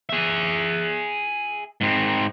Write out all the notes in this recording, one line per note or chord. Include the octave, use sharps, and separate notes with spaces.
G#4 E5
G#2 C4